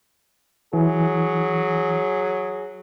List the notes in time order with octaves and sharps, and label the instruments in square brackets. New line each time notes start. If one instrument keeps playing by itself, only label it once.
[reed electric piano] E3 [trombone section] F#3 G#4